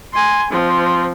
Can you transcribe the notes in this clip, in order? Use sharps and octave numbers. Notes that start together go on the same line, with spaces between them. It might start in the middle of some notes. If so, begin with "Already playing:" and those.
G#5 C6
F3 C4